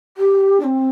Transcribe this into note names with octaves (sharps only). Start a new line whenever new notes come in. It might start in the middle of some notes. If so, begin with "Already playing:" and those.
G4
D4
C4